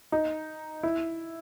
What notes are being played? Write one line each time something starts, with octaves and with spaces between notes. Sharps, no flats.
D#4
E4